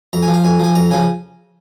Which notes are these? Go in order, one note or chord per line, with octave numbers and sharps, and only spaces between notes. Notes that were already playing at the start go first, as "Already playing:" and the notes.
F2 A#5
G#5
F3
F5
F2 G#5
F3 G#5
F2 A#5
C#3 F3 G#5